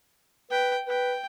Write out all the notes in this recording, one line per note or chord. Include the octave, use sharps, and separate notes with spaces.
B4 G5
B4 G5